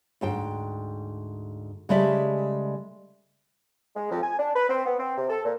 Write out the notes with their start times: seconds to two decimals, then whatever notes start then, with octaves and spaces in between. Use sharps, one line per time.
0.21 D2 G#2 G5
1.89 C#3 G3 G#3 A4 D5 E5
3.96 G#3
4.11 F2
4.22 G#5
4.39 D4
4.56 B4
4.69 C4
4.86 B3
4.98 C4
5.17 C3
5.30 A4
5.45 A#2